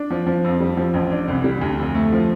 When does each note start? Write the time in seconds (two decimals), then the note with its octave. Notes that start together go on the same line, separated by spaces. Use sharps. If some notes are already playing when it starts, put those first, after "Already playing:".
Already playing: D4
0.10 F3
0.26 F3
0.44 F2
0.60 G3
0.77 F3
0.94 A1
1.11 D4
1.28 C2
1.44 G3
1.61 D2
1.78 F2
1.95 A3
2.12 F3